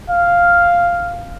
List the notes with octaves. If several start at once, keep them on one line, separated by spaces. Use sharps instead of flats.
F5